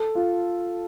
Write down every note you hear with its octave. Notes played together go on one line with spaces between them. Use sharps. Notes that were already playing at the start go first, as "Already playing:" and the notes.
Already playing: A4
F4